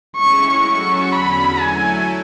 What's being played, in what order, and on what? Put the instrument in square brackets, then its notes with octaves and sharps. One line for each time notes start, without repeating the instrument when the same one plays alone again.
[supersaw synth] A2 G#3 C#4 E4 [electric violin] C#6
[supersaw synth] F#3 C#4 F#4 A4 [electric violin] C#6
[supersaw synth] E2 D3 F#3 C#4 [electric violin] B5
[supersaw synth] F#3 A3 E4 A4 [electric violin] G#5